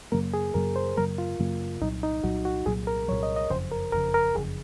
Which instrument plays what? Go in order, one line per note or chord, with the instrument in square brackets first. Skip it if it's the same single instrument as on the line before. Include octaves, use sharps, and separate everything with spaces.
[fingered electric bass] F#2 C#3 F#3 A#3 [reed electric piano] A#4
[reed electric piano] G#4
[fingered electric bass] F#2 C#3 F#3 A#3 [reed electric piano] A#4
[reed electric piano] C5
[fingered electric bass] F#2 C#3 F#3 A#3 [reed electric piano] A#4
[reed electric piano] F4
[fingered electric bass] F#2 C#3 F#3 A#3
[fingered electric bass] C2 A#2 F#3 [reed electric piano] D#4
[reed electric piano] D#4
[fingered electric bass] C2 A#2 F#3 [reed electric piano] F#4
[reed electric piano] F#4
[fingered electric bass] C2 A#2 F#3 [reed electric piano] G#4
[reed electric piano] A#4
[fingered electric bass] C2 A#2 F#3 [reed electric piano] C#5
[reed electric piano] D#5
D#5
[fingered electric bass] F#1 F2 C#3 [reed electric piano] C5
[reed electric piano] A#4
[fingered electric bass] F#1 F2 C#3 [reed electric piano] A#4
[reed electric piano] A#4
[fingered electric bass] F#1 F2 C#3 [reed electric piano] G#4